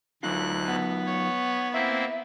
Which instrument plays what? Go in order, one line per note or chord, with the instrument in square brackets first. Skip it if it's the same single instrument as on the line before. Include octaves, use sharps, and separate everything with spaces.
[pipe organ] D2 F#6 [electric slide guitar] F#3 D#4 F4
[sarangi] B3
[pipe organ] C#5
[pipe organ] A#3 C4 E4 [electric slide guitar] E5